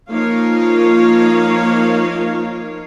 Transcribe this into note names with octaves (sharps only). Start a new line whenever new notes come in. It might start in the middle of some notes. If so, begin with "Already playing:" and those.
F3 A#3 D#4 A#4 C#5 F5